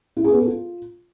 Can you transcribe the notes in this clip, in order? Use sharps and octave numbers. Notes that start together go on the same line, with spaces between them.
E4
G#4
B3
A4
F4